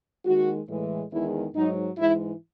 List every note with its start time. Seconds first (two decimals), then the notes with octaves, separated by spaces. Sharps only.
0.26 D#2 D#3 G#3 F#4
0.69 A2 E3 G#3
1.12 E2 D#3 G#3 E4
1.55 G#2 F#3 D#4
1.98 G#2 E3 G#3 E4